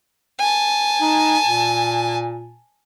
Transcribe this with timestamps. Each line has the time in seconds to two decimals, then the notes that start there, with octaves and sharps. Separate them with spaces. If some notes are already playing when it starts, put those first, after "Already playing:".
0.39 G#5 A5
1.01 D#4
1.45 A#2